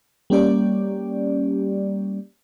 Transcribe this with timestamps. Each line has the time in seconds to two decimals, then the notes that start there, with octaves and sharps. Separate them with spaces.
0.30 G3 A#3 C#4 G4 D5